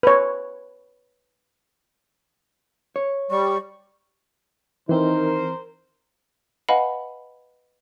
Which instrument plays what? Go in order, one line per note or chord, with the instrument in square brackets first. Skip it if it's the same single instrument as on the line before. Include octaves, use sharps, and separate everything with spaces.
[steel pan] B4 C#5
[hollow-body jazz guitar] C#5
[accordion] G3 [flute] C#6
[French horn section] D#3 D#4 [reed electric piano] E3 C4 [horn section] A#4 C5
[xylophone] B4 D#5 F5 F#5 G#5 B5